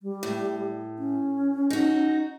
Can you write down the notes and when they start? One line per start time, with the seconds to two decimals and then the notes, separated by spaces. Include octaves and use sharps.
0.03 G3
0.23 A2
0.99 C#4
1.70 D#4 F#4